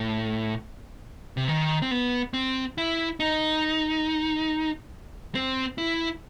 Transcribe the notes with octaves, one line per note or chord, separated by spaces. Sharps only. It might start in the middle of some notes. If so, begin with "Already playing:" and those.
Already playing: A2
C3
D#3
C4
B3
C4
E4
D#4
C4
E4